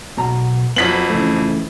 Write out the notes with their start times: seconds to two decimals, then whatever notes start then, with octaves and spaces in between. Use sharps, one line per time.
0.17 B1 B2 A#5
0.76 F2 F#3 B3 B6 F#7
1.10 C#3 E3 A3